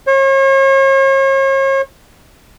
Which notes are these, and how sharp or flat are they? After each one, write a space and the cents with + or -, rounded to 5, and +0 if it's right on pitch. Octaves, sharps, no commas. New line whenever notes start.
C#5 -40